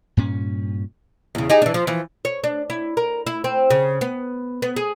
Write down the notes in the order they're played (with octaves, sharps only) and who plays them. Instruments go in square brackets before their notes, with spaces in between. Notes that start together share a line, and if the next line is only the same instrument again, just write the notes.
[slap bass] G2 A#2 C#4
[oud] E2 C#3
D#4 G4 G#4
E3 D4
F3
E3 F3
C#5
D4
E4
A#4
E4
C4
C#3
B3
B3
G#4